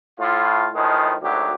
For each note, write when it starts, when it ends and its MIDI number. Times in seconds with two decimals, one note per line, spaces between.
0.19 0.68 45
0.19 0.68 65
0.74 1.13 45
0.74 1.13 51
0.74 1.13 53
0.74 1.13 56
1.22 1.53 32
1.22 1.53 38
1.22 1.53 54
1.22 1.53 67